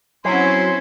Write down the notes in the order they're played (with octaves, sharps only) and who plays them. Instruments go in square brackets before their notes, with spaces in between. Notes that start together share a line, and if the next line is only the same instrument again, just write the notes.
[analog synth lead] F#3 [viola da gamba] C4 C#4 E4 [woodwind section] C#5 G#5 C6